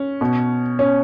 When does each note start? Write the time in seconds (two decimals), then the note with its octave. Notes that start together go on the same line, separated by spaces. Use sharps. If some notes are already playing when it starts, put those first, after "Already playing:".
Already playing: C#4
0.21 B2
0.79 C#4